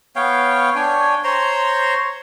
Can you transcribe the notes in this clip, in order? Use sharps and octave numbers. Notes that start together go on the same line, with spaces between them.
B3 C#5 F5 G5
D4 C#5 G5 G#5
C5 C#5 A#5 C6